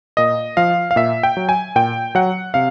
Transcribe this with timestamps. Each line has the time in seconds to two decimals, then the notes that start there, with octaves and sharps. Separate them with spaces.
0.17 A#2 D#5
0.57 F3 F5
0.91 F5
0.96 A#2 E5
1.23 G5
1.37 F#3
1.49 G#5
1.76 A#2 G5
2.15 F#3 F#5
2.54 C3 F5